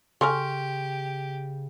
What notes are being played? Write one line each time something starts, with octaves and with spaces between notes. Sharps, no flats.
C#3 G4 A4 G#5 A#5 C6 C#6 F6